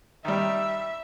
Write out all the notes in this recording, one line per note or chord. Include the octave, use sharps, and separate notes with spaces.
D#3 G3 E5